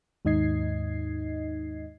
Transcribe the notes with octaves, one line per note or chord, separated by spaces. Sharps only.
D#2 G#2 D#4 D#5 G#6 C7